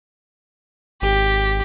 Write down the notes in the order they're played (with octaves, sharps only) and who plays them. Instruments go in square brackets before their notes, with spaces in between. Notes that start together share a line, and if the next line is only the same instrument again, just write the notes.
[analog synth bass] G#1 [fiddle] G4